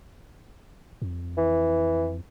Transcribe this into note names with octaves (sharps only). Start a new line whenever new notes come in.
F2
E3